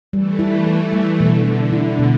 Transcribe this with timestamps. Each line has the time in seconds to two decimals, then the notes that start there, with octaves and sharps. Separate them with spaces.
0.12 E3 G3 A3
0.39 E4
0.67 A4
0.93 G3
1.19 B2 D3
1.46 A3
1.73 E4
1.99 B2